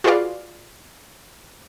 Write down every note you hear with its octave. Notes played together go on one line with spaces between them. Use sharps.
F4 F#4 G#4 B4 D5 F5